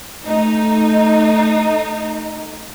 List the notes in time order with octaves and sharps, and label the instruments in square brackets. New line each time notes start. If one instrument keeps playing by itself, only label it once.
[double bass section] A3 [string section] D#4